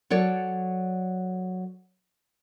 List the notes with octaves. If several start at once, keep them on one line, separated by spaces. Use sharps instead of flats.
F#3 A4 C#5 D5